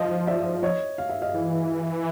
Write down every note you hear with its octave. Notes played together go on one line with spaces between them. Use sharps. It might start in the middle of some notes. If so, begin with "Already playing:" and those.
Already playing: F3 D#5 F5
D5 E5
C#5 D#5
F5
E5
D#5 F5
E3